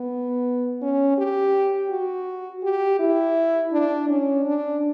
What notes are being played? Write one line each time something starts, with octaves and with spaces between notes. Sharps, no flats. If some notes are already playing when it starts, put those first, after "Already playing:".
Already playing: B3
C#4
G4
F#4
G4
E4
D4
C#4
D4